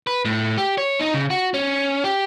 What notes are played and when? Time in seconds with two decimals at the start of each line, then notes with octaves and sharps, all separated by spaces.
0.07 B4
0.25 A2
0.58 G4
0.78 C#5
1.00 D#4
1.14 C#3
1.30 F#4
1.54 C#4
2.04 G4